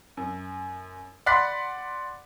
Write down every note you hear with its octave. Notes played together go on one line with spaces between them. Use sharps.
F#2
D5 F#5 B5 C6 F#6 B6